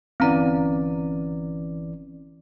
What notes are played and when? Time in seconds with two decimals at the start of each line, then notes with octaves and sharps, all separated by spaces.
0.20 G1 E3 C4 C#4 D5 A#5